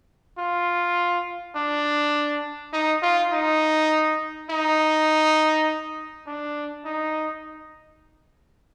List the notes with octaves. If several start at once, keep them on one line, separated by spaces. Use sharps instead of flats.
F4
D4
D#4
F4
D#4
D#4
D4
D#4